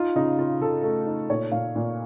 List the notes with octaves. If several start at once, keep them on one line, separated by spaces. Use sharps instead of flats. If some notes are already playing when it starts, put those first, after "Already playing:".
Already playing: D#4 F4
C#3 D#4
C#3 F4
C#3 A4
A3
D#4
A#2 C#5
A#2 F5
A#2